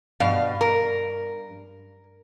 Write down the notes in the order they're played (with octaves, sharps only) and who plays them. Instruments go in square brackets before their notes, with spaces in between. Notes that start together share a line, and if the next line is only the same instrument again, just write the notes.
[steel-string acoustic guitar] G2 [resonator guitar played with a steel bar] B2 F5
[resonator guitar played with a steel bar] A#4